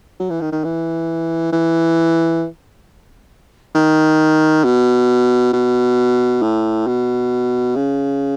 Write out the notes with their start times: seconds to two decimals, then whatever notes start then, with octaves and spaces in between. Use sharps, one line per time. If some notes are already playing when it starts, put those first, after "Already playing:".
0.20 F#3
0.30 E3
0.41 D#3
0.52 D#3
0.64 E3
1.52 E3
3.75 D#3
4.64 B2
5.53 B2
6.42 A2
6.87 B2
7.76 C#3